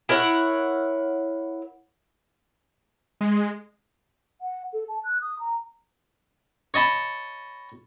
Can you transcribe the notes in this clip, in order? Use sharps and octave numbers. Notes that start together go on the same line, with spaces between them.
E4 A#4 C#5 F#5
G#3
F#5
A4
A5
F#6
D#6
A#5
C#5 D#5 A5 B5